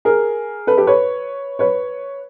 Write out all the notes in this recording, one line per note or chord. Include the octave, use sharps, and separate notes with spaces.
G#4 A#4
A4 B4
G4 A4
B4 C#5
B4 C#5